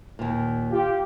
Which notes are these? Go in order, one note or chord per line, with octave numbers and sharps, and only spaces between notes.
D#2 A#2
F4 G4